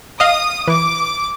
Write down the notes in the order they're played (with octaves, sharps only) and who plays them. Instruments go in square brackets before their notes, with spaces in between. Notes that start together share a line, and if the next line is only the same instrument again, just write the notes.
[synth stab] D#5 F5 [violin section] D#6
[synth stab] E3 [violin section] D6